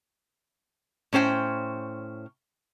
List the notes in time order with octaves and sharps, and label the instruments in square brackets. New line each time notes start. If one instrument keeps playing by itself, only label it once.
[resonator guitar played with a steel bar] A2 C#4 C5 G5